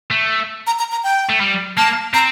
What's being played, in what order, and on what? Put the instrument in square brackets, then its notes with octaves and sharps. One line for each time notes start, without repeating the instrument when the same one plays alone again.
[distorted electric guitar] A3
[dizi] A#5
A#5
A#5
G5
[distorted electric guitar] A3
G3
[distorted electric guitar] A#3 [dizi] A5
[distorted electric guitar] C4 [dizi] A#5